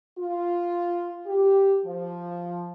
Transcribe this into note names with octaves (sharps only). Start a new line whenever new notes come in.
F4
G4
F3